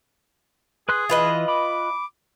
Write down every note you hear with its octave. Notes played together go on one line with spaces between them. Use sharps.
G#4 B4 C6 F#6
E3 F4 B4 D#5
B5 D6